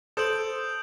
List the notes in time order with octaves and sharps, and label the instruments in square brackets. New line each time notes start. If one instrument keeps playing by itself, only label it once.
[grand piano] A4 C5 [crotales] D#6 G6 D7 F#7